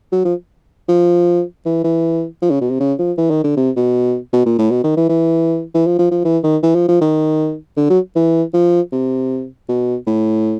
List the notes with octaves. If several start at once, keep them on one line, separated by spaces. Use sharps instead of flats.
F#3
F3
F3
E3
E3
F3
C#3
B2
C3
C#3
F3
E3
D#3
D3
C3
B2
B2
A#2
A2
B2
D#3
E3
E3
E3
F3
F3
F3
E3
D#3
E3
F3
F3
D#3
D3
F#3
E3
F3
C3
B2
A2